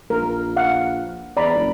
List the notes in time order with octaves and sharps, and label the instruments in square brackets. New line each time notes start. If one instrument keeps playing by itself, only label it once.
[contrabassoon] A#1 [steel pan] A#4
[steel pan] F5 F#5
[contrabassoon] E2 [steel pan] D5 A#5 B5
[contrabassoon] F#1